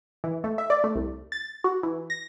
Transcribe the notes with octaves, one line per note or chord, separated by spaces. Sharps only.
E3
A3
E5
D5
A3
C2
A6
F#4
E3
A#6